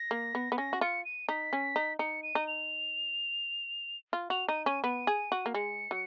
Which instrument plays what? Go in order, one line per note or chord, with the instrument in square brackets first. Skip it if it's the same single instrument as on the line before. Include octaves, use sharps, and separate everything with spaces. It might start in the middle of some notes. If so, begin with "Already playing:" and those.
Already playing: [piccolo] A#6
[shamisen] A#3
B3
B3
[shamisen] C#4 [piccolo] A#6
[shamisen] F#4
[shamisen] F4 [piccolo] C#7
[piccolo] D#7
[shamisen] D#4 [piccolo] B6
[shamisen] C#4
D#4
[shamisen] D#4 [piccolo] C#7
[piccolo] D#7
[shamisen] D#4
[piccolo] F7
[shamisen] F4
[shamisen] F#4 [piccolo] F7
[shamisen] D#4 [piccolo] D#7
[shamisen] C#4 [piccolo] D#7
[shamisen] B3 [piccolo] D#7
[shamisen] G#4
F#4
A#3
[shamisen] G#3 [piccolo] C#7
[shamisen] F#3